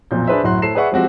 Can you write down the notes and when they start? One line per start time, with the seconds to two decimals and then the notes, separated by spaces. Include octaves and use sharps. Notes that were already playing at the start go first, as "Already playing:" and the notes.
0.11 B1 F2 A#2 G6
0.27 D4 G#4 B4 C5 E5
0.44 D1 F#2 A2 F#4 C6 F#6
0.62 A2 E4 A4 C5 C7 E7
0.75 G#4 B4 D5 E5 F#5 C#6
0.92 F3 G#3 C4 F#4 G4